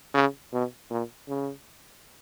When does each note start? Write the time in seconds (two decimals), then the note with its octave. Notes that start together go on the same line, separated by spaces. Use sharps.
0.14 C#3
0.52 B2
0.90 A#2
1.28 C#3